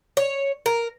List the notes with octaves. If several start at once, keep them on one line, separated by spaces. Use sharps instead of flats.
C#5
A#4